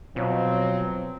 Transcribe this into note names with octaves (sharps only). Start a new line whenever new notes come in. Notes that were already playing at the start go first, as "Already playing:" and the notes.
B2 F3 F#3 C4